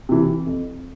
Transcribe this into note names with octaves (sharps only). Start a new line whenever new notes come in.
C3 E3
F2